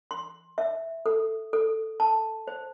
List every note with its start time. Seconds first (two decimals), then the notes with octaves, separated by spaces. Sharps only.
0.11 C6
0.58 E5
1.06 A4
1.53 A4
2.00 A5
2.47 C5